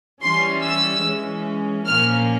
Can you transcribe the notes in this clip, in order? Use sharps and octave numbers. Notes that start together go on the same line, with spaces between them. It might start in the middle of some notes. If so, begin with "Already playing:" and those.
E3 G3 C#4 C6
E6
E3 G#3 C#4
A#2 F3 A#3 C#4 F6